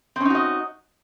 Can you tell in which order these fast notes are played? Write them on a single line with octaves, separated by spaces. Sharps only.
C4 C#4 D#4 F#4 D#5